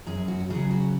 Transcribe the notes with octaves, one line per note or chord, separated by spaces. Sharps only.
F#2 G#4
F#4
C#3 F#3 G#4
F#4